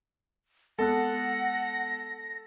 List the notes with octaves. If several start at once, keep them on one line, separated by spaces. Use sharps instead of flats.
G#3 B3 A4 F#5 F#6 A#6